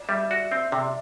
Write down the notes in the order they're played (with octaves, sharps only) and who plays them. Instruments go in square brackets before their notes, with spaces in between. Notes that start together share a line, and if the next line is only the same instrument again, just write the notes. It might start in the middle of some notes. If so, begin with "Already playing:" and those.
Already playing: [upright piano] D5
[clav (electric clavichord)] G3 [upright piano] E5
[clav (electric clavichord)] F#4 [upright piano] D5
[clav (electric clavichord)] C4 [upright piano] E5
[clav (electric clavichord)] C3 [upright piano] D5